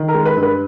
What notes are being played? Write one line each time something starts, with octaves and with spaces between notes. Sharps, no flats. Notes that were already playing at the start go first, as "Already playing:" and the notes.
Already playing: D#3
A#4 A#5
G#3
B4 B5
G2
B4 B5